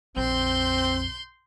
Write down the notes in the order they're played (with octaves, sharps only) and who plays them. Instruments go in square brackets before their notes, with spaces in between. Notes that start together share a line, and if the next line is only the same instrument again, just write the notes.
[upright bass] A#1 F2 [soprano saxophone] C4 [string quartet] C6 G6